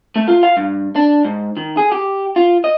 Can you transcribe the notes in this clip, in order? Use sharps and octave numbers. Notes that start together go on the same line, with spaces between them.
A3
F4
F5
G2
D4
G#2
D#3
G#4
G4
F4
D#5